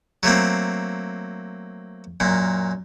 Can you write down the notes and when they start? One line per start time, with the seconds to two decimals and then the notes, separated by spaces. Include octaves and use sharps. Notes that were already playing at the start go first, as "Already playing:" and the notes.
0.23 F#3 A3 A#3 C4
2.20 F#2 A#2